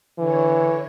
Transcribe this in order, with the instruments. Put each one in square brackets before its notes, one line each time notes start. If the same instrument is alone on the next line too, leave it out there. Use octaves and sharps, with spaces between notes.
[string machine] D3 C#5 [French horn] E3